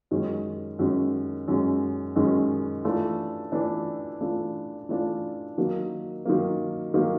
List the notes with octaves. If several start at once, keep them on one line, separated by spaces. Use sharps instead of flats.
F#2 D#3 G#3 C#4
F#2 D#3 G#3 C#4
F#2 D#3 G#3 C#4
F#2 D#3 G#3 C#4
E3 A3 D4 F4
E3 A3 D4 F4
E3 A3 D4 F4
E3 A3 D4 F4
D#3 F#3 A#3
D#3 F#3 A#3
D#3 F#3 A#3